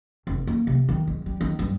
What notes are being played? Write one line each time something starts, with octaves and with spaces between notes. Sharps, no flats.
F1
A#3
C3
D#3
G#3
G3
D#3
G2